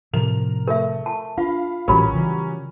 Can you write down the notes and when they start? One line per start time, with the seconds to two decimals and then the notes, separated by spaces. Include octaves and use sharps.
0.13 A2 C3 F3 A#4 F7
0.68 A3 A#4 E5
1.06 A5
1.37 D4 F4 F5 B5
1.88 A#1 A2 E3 F#3 G3 C#4 A#4 B5
2.13 C#3 E3